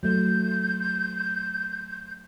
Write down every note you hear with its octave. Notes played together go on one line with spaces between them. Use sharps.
F#3 A3 G6